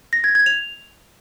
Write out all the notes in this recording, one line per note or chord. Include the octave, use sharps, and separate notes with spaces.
A#6
G#6
G#6
F7